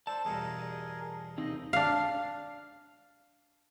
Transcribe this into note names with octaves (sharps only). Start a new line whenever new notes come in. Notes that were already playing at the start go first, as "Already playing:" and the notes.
D4 A4 C5 A5
E2 G2 B2 G#4 A#4
D#2 C3 C4 D#4 D#5
D4 F5